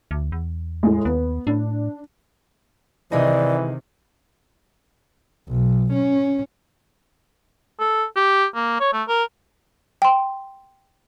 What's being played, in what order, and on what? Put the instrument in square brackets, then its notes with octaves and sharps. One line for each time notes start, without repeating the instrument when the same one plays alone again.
[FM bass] D2
E2
[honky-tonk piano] A2 G#3
[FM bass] D#2 [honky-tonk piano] B3
[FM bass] A2 [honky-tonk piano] D4
[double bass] C3 D#3 [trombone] E3 [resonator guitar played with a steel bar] G#3 D#4 [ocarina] D5
[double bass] B1
C#4
[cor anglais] A4
G4
A#3
C#5
A3
A#4
[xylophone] G5 C6